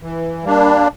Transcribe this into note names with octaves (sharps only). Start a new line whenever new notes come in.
E3
G3 A#3 D4